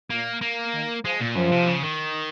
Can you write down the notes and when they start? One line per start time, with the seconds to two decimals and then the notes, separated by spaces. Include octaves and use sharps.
0.10 A#2 A#3
0.41 A#3
0.74 D#3
1.05 F3 G#3
1.21 A#2
1.35 F#2 F3
1.51 C3
1.67 C#3
1.83 D#3